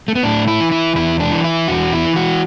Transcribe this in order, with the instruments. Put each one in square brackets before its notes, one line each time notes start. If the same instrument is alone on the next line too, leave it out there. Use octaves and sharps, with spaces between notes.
[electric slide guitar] A3
B3
A2 D4
E4
E3
E4
E2 E4
D4
E3
E4
E2 F#4
E4
E3
F#4